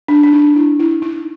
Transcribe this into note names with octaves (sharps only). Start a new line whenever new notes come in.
D4
D4
D#4
E4
E4
D#4